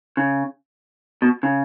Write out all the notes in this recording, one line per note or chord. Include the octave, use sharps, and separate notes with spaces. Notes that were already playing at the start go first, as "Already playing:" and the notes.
C#3
B2
C#3